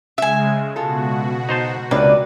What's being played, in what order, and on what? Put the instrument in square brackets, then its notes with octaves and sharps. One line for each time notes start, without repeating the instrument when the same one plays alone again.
[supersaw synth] C#3 G#3 [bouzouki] E5 G#5
[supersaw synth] B2 F#4 [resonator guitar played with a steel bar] F4 A4
[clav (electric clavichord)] D#4 C5 A5
[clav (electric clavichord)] C#2 C3 A#3 [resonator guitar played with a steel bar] B3 D4 D5 [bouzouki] B4